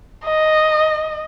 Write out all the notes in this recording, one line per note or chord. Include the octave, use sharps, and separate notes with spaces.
D#5